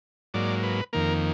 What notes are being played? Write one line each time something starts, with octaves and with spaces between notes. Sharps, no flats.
G#2 F#3 A#3 D5
B4
F2 D#3 A#3 A#4